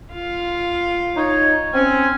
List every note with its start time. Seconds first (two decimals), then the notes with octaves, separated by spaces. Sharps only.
0.13 F4 F5
1.16 D#4 C#5
1.74 C4 C#4 G#5